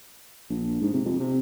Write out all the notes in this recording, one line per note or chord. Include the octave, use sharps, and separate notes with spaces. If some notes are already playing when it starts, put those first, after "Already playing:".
A#1
G#2
C3
F2
C3